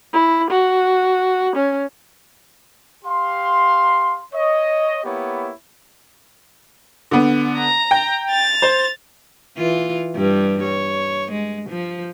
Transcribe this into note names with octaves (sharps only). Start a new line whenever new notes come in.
E4
F#4
C#4
G4 F5 C6
C#5 D#5
A#3 B3 E4 G4 C#5
D3 B3
A#5
G5
A6 F7
C5
E3 F4
G2 G3
C#5
G#3
F3